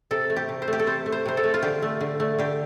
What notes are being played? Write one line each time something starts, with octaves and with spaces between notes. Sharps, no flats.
C3 A4
A3
G4
C3
C5
A3
G4
A4
C3 C5
A3
C5
C3 C5
A4
A3
F4
D3 G4
A3
D3
A3
D3 G4